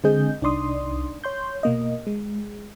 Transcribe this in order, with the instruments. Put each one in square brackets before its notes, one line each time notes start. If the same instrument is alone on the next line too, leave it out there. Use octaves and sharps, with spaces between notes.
[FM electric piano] D3 G#3 C4 G#4 D#5 G6
C2 D4 D#4 D5 C6 D#6
C#5 C6 G6
B2 A#3 D#5
G#3